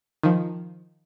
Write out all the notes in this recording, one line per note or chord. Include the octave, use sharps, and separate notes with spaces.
D#3 F3